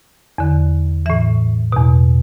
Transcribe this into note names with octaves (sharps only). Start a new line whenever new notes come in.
E2 D3
A2 E3 E5
E2 B2